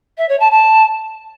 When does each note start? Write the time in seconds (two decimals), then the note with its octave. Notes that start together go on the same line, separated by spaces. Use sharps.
0.18 E5
0.29 C#5
0.40 A5
0.51 A5